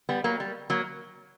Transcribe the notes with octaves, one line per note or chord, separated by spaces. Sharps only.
G3 B3
F#3 A#3
G3
F#3 A#3